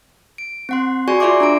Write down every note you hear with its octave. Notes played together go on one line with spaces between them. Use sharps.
D7
C4 F#5 C6
F#4 G#4 D5 G#5 C#6
F4 G#4 D5 E5 C6 D6
D4 A#5 D7